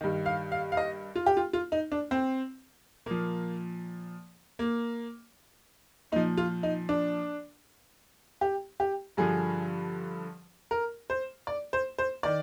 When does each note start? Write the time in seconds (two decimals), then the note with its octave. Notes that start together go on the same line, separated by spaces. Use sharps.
0.01 G2 D#3
0.26 F5
0.52 F5
0.72 F5
0.77 D#5
1.15 F4
1.26 G4
1.37 F4
1.53 F4
1.72 D#4
1.92 D4
2.11 C4
3.06 A#2 F3 A#3
4.59 A#3
6.12 A#2 D#4
6.16 F3
6.37 F4
6.63 D#4
6.89 D4
8.41 G4
8.80 G4
9.17 G2 D3 F3 G#4
10.71 A#4
11.10 C5
11.47 D5
11.73 C5
11.98 C5
12.23 D#3 D5